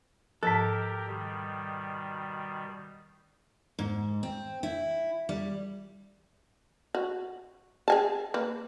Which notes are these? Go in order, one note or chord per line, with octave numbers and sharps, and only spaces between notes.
G#2 F3 G4 A4 A#4
B2 D#3 G3
G#2
C4
E4
G3
F#4
G#4 G#5 A5
A#3 B4